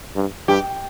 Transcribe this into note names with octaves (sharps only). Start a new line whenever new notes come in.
G2
G2 G4